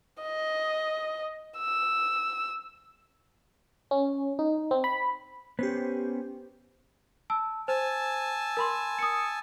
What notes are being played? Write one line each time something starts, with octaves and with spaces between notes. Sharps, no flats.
D#5
E6
C#4
D#4
C4
B5
B3 C#4 G4 C5
A5 E6
C5 G#5 A5 E6
A#4 B5 C6
D#6 C#7